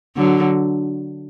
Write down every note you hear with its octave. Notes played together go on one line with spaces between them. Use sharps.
D3 F#3